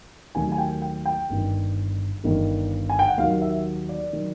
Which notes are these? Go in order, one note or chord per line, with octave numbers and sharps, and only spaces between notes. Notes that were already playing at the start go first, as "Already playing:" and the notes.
D#2 D#3 F#3 A3 G#5
G#5
G5
G5
G5
G1 G2 D#3
G1 G2 D#3
G#5
G5
F#5
D#2 D#3 F#3 F5
E5
D5
D#3 F#3